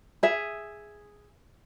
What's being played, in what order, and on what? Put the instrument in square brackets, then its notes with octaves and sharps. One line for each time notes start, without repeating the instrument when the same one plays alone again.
[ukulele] G#4 E5